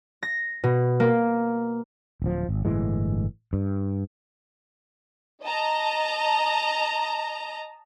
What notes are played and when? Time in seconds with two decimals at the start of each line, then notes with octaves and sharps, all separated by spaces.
0.23 A#6
0.64 B2
1.00 A#3
2.22 D1 F3
2.49 G#1
2.65 G1 A2 E3 G#3
3.53 G2
5.44 D#5 A5 A#5